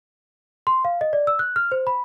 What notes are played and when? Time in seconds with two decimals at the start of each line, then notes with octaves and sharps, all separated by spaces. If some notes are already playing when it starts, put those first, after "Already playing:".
0.67 C6
0.85 F5
1.01 D#5
1.13 D5
1.27 E6
1.39 F#6
1.56 F6
1.72 C5
1.87 B5